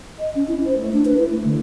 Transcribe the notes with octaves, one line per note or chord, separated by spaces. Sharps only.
D#5
C#4
E4
C5
A3
D4
B4
E4
A3
D3